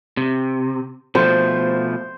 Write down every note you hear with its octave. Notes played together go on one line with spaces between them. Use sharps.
C3
B2 F3 A3 C5